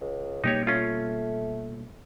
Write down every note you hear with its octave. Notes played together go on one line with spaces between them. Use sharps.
C#2
B2 G3 A#3 D#4 G4 C#5
A3 C#4 F4